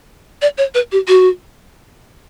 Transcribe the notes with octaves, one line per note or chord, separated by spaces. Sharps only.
D5
C#5
B4
G4
F#4